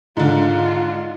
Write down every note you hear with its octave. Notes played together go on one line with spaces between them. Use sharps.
G#2 D3 F4